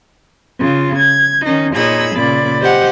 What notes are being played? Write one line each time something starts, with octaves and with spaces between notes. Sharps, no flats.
C#3 F4
G#6
D#3 C#4 D#4
A#2 D#4 G#4 C#5 B5 E6
A#2 C#3 D5 B5
G4 C5 D#5 F#5